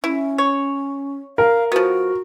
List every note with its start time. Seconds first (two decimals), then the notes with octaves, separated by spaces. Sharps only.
0.04 C#4 E4
0.38 C#5
1.38 A#4 F5
1.72 F3 B3 F#4